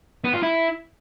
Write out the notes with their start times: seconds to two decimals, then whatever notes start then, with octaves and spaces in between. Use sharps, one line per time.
0.24 B3
0.34 F4
0.43 E4